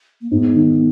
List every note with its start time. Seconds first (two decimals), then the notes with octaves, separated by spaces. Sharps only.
0.21 A#3
0.31 G#2 B3
0.55 D#3